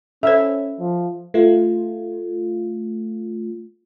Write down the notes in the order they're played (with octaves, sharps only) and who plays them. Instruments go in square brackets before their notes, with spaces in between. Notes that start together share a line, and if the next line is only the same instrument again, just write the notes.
[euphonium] C#4 [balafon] A4 C5 [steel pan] E5
[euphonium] F3
[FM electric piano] A3 F4